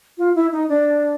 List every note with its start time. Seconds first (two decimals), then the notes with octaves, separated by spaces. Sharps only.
0.18 F4
0.35 E4
0.52 D#4
0.69 D4